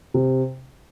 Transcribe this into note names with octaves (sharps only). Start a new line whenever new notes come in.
C3